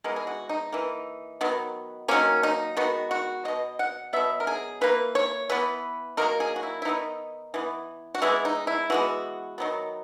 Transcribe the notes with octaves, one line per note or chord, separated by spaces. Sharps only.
E3 G#3 B3 A#4
G#4
F#4
D#4
E3 A#3
D#3 F#3 B3
D#3 F#3 A#3 C#4
D#4
D#3 G#3 B3 F#4
F#4
B2 A#3 D#5
F#5
B2 F#3 B3 E5
A#4
G#4
E3 A#3 B4
C#5
E3 B3 B4
D#3 F#3 A#3 A#4
G#4
F#4
E4
E4
D#3 F#3 B3 D#4
E3 B3
F#4
E3 G#3 B3 E4
D#4
E4
E3 G#3 B3 F#4
D#3 F#3 B3